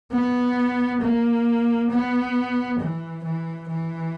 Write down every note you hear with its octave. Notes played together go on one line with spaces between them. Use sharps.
B3
A#3
B3
E3
E3
E3